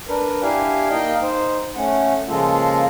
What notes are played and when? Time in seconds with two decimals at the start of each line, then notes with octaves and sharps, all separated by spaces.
0.08 D4 A#4 B4
0.43 D4 E4 G4 F5 G#5
0.90 A#3 D#4 D#5 F5 G5
1.22 D#4 C5
1.76 A3 C#4 F#5
2.28 C#3 F3 G#3 A#3 F4 A4